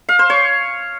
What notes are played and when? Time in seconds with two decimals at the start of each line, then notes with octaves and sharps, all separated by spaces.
0.09 F5
0.19 C5
0.30 C#5